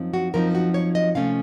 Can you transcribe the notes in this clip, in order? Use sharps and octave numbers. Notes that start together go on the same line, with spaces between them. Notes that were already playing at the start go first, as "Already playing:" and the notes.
Already playing: F#2 F3 C4 D#4
F#4
F#2 F3 C4 D#4 A#4
F#4
C#5
D#5
C3 F3 A3 C#4 F5